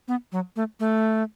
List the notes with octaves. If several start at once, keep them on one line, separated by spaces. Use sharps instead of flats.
B3
F#3
A3
A3